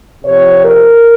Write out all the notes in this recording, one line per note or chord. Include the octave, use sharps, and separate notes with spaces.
C3 F3 C#5
A#4